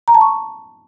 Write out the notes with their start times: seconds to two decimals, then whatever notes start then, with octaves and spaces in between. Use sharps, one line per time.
0.08 A#5
0.14 A5
0.21 C#6